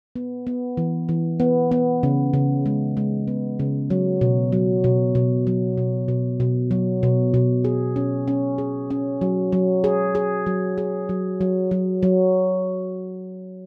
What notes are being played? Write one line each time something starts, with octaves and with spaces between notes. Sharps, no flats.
B3
B3
E3
E3
B3
B3
C#3
C#3
G#3
G#3
B3
C#3
F#3
B2
F#3
B2
B2
F#3
B2
B2
B2
F#3
B2
B2
G#4
C#4
C#4
G#4
C#4
F#3
F#3
G#4
G#4
F#3
G#4
F#3
F#3
F#3
F#3